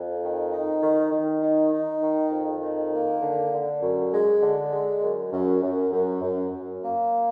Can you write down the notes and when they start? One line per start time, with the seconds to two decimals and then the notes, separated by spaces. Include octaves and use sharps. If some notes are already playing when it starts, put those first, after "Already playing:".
Already playing: F2
0.22 D#3
0.51 D#4
0.82 D#3
1.12 D#3
1.42 D#4
1.72 D#4
2.02 D#3
2.32 F2
2.62 D#3
2.92 A#3
3.22 D3
3.52 D3
3.82 F#2
4.12 G#3
4.43 D3
4.72 G#3
5.02 F#2
5.32 F#2
5.62 F#2
5.92 F#2
6.22 F#2
6.52 F#2
6.83 A#3